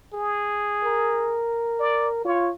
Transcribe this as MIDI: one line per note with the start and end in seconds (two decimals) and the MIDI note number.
0.14 1.42 68
0.84 2.23 70
1.79 2.08 74
2.25 2.51 65
2.25 2.50 73